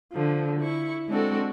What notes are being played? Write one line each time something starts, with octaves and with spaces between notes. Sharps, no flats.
D3 F3
E4 C#6
G#3 C4 D4 F#4 A4